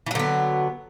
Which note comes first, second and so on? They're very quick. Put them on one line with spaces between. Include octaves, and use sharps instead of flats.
E3 F#3 D3 B3